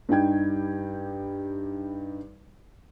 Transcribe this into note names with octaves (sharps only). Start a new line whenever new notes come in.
G2 G3 D#4 G5 G#6